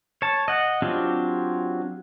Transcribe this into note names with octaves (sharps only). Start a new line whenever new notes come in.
C#5 A5
D#5 F#5
F#3 C4 D4 F4 G4